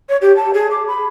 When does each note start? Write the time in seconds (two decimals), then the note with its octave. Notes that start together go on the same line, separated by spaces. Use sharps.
0.09 C#5
0.22 G4
0.36 A5
0.54 G#4
0.71 D6
0.87 B5